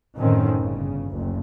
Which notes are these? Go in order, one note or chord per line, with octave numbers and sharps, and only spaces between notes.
F#2 A2 D3 D#3 C4 C#4
G1 C#3
F#1 D2